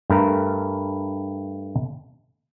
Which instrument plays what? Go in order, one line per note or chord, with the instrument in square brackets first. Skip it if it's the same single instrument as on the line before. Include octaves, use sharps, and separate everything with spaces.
[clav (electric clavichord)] G2 A3 A#4